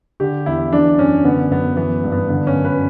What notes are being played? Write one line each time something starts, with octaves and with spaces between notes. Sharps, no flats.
D3 G4
E2 E4
E3 D4
F#2 C#4
D3 B3
F#2 B3
E3 B3
G2
B3
D3 B3
C#4
F#2
B4